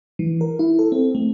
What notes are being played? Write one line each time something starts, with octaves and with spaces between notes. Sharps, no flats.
E3
A#4
E4
A4
C4
A3